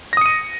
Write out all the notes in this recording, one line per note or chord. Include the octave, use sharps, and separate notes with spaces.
D#6 A#6 C#7 D#7